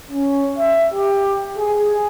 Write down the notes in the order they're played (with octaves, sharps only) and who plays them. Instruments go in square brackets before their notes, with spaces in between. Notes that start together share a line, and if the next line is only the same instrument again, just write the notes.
[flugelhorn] C#4
E5
G4
G#4